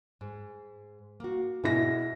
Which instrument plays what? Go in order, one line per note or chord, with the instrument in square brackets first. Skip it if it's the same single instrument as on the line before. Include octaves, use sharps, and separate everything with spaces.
[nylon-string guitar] G#2
A#3 F#4
[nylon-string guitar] G#2 [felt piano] B2 E4 A#6